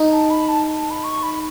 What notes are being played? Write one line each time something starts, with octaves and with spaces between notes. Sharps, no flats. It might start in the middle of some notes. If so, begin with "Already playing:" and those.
Already playing: D#4
A5
B5
A5
A5
B5
C#6
B5